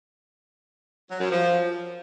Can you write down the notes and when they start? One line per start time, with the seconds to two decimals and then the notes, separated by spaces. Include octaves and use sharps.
1.09 F#3
1.20 F#2
1.30 F3